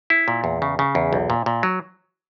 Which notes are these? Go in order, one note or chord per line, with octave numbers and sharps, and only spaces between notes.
E4
A#2
E2
C#3
C#3
E2
B1
A#2
A#2
F#3